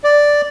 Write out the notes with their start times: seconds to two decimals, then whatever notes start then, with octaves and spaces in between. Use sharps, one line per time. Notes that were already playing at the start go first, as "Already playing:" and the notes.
0.04 D5